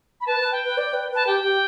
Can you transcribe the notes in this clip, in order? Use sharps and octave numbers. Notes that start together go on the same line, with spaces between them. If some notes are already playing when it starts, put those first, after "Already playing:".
B5
B4 A5
B4
G5
B4
D5
B4
B4 A5
G4 G5
G4